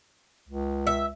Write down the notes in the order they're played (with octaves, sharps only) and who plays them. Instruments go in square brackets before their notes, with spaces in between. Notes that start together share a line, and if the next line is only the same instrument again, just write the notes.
[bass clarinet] C#2
[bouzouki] E5